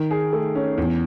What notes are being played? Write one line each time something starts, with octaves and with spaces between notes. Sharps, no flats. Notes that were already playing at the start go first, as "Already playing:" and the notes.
Already playing: D#3
G#4
A3
C#4
E2